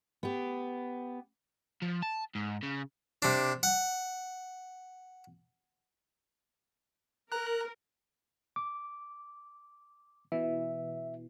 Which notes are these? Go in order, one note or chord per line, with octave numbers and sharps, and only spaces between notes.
B3 G4
F3
A5
G#2
C#3
C3 D4
F#5
A#4 A#5 F#6
D6
B2 E3 E5